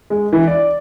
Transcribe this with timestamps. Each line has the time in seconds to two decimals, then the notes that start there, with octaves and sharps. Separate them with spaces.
0.10 G#3
0.33 E3
0.48 D5